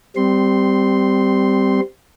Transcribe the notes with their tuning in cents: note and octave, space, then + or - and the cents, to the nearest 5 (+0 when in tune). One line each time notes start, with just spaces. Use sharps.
G3 +0 C4 -20 C6 +0